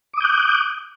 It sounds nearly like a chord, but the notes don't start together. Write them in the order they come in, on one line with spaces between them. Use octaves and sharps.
D6 D#6 G6 F#6